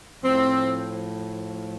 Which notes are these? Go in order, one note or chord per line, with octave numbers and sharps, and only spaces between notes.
A2 F3 C4